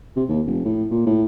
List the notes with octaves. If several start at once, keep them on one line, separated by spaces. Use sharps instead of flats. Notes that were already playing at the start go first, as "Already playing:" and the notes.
C3
D#2
F1
A2
A#2
A2